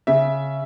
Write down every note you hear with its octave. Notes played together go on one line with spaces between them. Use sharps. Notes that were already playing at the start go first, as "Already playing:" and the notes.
C#3 E5